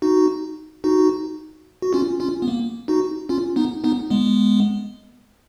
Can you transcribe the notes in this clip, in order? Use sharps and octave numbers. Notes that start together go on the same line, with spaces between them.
D#4 F#4
D#4 F#4
F#4
C#4 F4
C#4 F4
B3
A#3
D#4 F#4
C#4 F4
B3 D#4
B3 D#4
G#3 B3